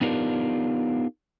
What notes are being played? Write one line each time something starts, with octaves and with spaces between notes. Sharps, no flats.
B3 D4 D#4 F4 G4 A#4